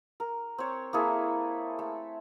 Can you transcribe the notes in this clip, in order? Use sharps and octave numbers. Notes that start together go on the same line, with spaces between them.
A#4
C4 C#5
A#3 E4 G#4 A4
A3